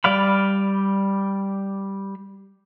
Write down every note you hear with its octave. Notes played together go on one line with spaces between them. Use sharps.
G3 D5 F5 B5